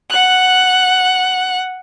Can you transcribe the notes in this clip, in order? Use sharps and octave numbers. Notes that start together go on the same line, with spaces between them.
F#5 F#6